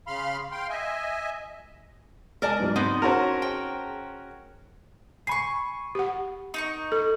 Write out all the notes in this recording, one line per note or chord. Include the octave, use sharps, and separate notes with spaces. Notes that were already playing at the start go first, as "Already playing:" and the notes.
C#3 F5 B5 C6 F6
F5 G5 C6
D#5 E5 G#5
G#3 A#4 D5 D#5 G#5 A5
G#2 F#3 B3
B3 C4 D#4 B5
C#4 F#4 G#4 A#4 C5 A5
G5
G#5 B5 C#6 C7
G4 F#5
D#4 A#4 C#6
A4